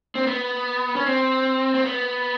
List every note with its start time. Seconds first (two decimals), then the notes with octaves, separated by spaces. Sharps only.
0.15 C4
0.27 B3
0.96 C#4
1.06 C4
1.75 C4
1.85 B3